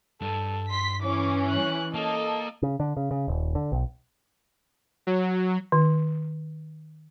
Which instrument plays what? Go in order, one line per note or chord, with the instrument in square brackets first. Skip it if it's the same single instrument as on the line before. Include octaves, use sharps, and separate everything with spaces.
[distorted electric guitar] G2 [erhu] A4
[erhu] C6 [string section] B6
[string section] E3 C#4 [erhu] D6
[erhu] F#6
[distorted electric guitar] A#3 [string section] A4 [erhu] D#5
[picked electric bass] C#3
D3
C#3
C#3
D#1
D3
B1
[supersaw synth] F#3
[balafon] D#3